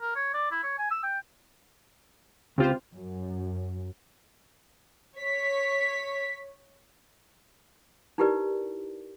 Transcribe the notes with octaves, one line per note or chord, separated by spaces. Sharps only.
A#4
C#5
D5
E4
C#5
G#5
E6
G5
C#2 C4 F4 G4 C5
F#2
C#5 B6
D#4 E4 G4 A#4 B4 D5